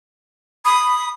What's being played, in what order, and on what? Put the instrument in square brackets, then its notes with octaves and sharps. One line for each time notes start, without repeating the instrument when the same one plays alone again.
[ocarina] B5 [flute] D#6